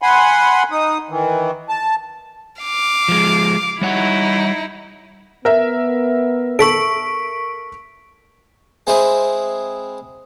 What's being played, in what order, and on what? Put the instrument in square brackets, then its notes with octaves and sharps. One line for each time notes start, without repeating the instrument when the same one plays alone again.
[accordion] F#5 G#5 B5 C6
D#4 D#6
D#3 E3
A5
[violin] F5 D6
[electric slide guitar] F3 G#3
[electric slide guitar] G3 C#5 F#5 [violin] D#4 E4
[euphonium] B3 [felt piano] A#4 E5
[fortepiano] A4 [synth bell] C#6 B6 D7
[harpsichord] G#3 C4 E4 G#4